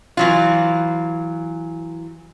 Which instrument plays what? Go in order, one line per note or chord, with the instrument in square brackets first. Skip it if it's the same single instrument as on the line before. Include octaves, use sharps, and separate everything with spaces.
[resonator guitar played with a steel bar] E3 F#3 F4